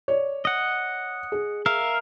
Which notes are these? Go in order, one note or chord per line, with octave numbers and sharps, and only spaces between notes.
C#5 D5
D#5 F#5
G#4
A#4 E5 F5